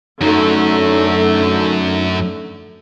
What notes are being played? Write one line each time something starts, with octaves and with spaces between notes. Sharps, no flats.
F#2 D3 F#3 A3 D#4 A#5